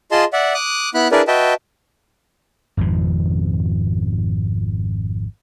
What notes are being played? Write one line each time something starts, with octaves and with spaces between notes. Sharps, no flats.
F4 G#4 D#5 A5 C6
D5 E5 F#5
D6 D#6 F#6
B3 E4 B5 F#6
D4 E4 G#4 A#4 B4 D5
F#4 B4 D#5 E5 G5 A5
G#1 F2 G#2 B2